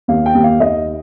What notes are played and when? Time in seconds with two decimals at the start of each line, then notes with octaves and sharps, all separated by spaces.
0.08 D#2 F5
0.26 G5
0.35 D#2
0.44 F5
0.60 D#2 D#5